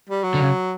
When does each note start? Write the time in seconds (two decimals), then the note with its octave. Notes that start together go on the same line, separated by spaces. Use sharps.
0.09 G3
0.24 F#3
0.34 D3
0.40 C#3